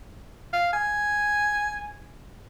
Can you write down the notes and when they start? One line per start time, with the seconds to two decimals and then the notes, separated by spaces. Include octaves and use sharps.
0.53 F5
0.73 G#5